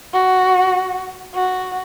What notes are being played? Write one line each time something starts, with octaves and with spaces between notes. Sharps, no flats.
F#4
F#4